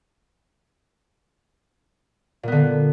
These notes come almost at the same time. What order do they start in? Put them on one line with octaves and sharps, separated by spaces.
A#2 B3 D3